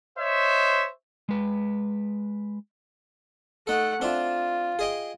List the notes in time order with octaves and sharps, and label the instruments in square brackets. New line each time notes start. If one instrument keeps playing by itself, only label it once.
[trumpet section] C5 C#5 D#5 E5
[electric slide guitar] G#3 B4
[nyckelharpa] A3 F#5 [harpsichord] D#4 A4
[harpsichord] C4 D4 E5 [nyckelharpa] F4
[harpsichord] G#4 D#5 G5